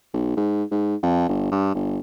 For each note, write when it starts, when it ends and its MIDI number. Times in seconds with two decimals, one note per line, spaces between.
0.14 0.32 35
0.37 0.63 44
0.72 0.95 44
1.03 1.25 41
1.29 1.48 31
1.52 1.74 43
1.75 2.00 31